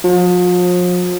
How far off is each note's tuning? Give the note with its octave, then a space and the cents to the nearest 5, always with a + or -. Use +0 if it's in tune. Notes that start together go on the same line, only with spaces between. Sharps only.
F3 +40